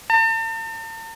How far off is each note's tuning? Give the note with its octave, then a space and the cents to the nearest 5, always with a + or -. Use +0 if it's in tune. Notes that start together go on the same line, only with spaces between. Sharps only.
A5 +45